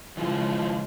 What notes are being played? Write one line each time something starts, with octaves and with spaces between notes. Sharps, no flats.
C#3 E3 F3 G#3 F4